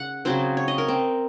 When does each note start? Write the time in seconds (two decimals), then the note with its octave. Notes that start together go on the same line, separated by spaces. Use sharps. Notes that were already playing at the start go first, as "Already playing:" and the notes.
Already playing: C#3 F#5
0.25 C#3 F#3 C4 C5
0.57 C#5
0.68 D#5
0.78 A#4
0.88 C4